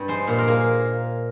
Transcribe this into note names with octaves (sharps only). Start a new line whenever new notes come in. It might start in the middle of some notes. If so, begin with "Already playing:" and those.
Already playing: G2
G#3 C5
A#2 C5
A#4
A#3 G#4